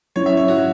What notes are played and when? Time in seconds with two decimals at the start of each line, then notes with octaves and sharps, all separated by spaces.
0.16 F#3 C#4 E4 C#5
0.26 E5
0.37 C#5
0.48 F#4